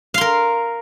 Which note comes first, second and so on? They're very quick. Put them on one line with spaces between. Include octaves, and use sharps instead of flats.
F5 C6 A#4